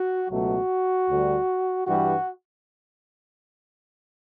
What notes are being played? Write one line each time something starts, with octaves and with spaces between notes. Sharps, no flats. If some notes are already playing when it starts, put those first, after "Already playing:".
Already playing: F#4
C#2 B2 F#3 A3 F#4
D2 D3 G3
G2 E3 G3 F#4